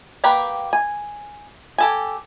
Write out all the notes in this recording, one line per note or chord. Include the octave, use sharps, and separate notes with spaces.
A#3 G4 A#4 B4 G5
G#5
G4 A4 G#5